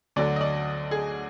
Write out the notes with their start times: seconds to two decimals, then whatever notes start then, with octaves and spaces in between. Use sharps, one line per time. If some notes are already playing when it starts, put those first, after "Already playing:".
0.16 D2 D3 F#3 D5
0.36 D#5
0.41 D5
0.91 G#4